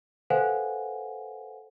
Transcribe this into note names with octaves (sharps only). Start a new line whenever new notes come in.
A4 B4 C5 F5 F#5 G#5